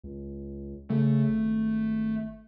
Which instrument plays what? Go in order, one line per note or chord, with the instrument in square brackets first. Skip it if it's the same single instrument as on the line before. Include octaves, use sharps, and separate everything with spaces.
[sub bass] C#2
[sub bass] C#3 [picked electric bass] A3
[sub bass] G#1